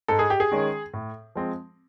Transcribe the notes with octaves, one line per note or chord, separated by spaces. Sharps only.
G#2 A4
G#4
G4
G#4
D#3 G#3 C#4
A2
F3 G#3 C4